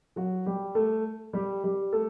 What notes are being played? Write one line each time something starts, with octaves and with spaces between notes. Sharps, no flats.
F#3 F#4
G3 G4
A3 A4
G3 G4
G3 G4
A3 A4